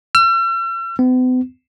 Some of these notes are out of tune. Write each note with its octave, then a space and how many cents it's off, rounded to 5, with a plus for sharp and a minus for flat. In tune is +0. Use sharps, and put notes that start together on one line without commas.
E6 +45
B3 +45